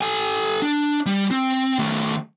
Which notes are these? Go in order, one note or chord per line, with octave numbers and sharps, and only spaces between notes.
A4 G#5
D4
G3
C4
D#3 A3